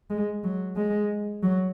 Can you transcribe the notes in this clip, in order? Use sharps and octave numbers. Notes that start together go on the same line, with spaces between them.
G#3
F#3
G#3
F#3